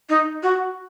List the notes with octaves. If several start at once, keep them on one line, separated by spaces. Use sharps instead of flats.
D#4
F#4